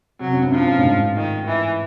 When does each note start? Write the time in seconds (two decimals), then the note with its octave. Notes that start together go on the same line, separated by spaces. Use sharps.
0.20 C3 F#3
0.31 F#2
0.42 G2
0.52 F3
0.68 G2
0.78 A2
0.84 G#2
1.16 D#3
1.47 E3